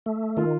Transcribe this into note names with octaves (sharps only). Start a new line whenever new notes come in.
A3
D#3 F4